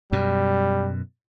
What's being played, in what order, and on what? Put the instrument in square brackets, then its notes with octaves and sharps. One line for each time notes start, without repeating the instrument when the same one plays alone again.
[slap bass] F#2 B2 [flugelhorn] G3